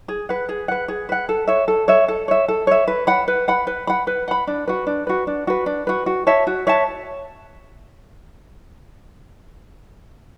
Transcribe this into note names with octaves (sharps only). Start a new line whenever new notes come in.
G#4
B4 F#5
G#4
B4 F#5
G#4
B4 F#5
A4
C#5 E5
A4
C#5 E5
A4
C#5 E5
A4
C#5 E5
B4
F#5 B5
B4
F#5 B5
B4
F#5 B5
B4
F#5 B5
D4
F#4 B4
D4
F#4 B4
D4
F#4 B4
D4
F#4 B4
F#4
C#5 E5 A5
F#4
C#5 E5 A5